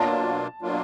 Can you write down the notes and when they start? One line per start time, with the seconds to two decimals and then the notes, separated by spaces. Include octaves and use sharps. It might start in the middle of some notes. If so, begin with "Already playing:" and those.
Already playing: B2 F#3 A#3 D4 F4 A5
0.62 B2 F#3 A#3 D4 F4